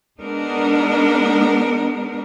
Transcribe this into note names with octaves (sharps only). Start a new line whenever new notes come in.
G#3 B3 D4 D#4 A#4